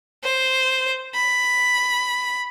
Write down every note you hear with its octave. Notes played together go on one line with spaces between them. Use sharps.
C5
B5